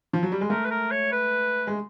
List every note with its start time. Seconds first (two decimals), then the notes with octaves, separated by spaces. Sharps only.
0.13 F3
0.23 F#3
0.32 G3
0.41 G#3
0.50 A3 A#4
0.65 B4
0.71 A#4
0.91 C#5
1.12 B4
1.67 G#3